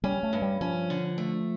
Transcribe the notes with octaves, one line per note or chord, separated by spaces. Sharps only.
G3 C#4
A3
G2
G3
F3 C#4
D3
A3